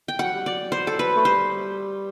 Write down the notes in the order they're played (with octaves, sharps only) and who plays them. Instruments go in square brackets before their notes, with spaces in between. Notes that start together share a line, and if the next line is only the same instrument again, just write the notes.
[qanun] G5
[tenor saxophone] F#3 [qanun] F#5
[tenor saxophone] G3
[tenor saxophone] F#3 [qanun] D5
[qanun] C5
A4
B4
[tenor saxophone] A3
[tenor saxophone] G3 [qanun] C5